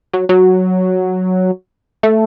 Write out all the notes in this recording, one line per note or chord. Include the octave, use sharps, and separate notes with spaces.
F#3
F#3
A3